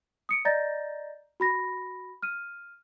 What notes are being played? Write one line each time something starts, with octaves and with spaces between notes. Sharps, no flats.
D#6 C#7 D7
D5 D#5 A#5 G6 A6 A#6
F#4 B5 A#6
F6 D#7